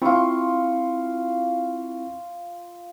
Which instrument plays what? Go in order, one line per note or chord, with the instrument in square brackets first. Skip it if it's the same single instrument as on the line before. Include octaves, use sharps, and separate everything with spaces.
[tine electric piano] C4 E4 [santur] F4 C#6